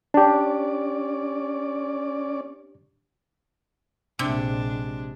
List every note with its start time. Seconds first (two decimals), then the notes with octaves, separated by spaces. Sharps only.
0.14 C#4 D4 G4 D5
4.19 A#1 C3 G#3 D4